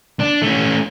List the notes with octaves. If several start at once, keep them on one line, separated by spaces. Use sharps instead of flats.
D4
A3 C#4